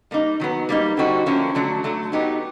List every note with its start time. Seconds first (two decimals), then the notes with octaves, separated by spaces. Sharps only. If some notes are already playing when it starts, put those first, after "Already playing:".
0.11 G3 A#3 D#4
0.40 D#3 F#3 B3
0.69 G3 A#3 D#4
0.97 D3 G3 C4 D#4 F#4
1.26 D3 F3 A#3 C#4 E4
1.55 D3 F#3 A3 D4
1.84 F#3 A3 D4
2.12 F#3 B3 D#4 G4